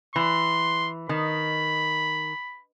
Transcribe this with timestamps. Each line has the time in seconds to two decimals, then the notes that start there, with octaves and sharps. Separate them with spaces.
0.16 E3 C6
1.09 D#3 B5